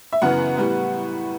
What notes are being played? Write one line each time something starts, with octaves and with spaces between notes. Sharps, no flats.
E5
F#2 C#3 E3 B3 F#5
A2 G3 B3